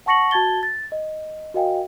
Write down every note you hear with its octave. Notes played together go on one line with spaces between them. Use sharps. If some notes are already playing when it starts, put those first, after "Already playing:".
F#5 A5 C#6 A#6 C#7 F#7
F#4 A5 G#6 A6 G7
A6
D#5
F#4 A#4 D#5 F5 G5 G#5